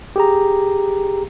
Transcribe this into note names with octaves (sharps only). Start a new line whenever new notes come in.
G4 G#4 A#5